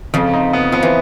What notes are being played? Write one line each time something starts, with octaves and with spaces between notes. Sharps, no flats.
F2 C#3 F3
D#4
B3
F3 B3
E3